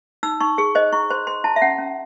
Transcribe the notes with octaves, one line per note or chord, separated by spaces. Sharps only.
D#4 E6
D#4 C#6
G#4 C#6
C5 D#5
E4 C#6
C5 C6
C5 C6
E4 A5
E5
C#4 F#5
C#4